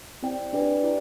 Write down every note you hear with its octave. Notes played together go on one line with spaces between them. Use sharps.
C4 E4 G4 D5 G5
D4 G4 B4 D5 G5
E4 G4 D5